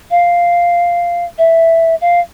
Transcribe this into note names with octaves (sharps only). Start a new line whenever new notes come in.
F5
E5
F5